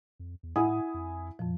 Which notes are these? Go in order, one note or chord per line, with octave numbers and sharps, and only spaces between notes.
F2
E2
A2 E4 F#5 G#5 D#6
F2
F2 A#2 F3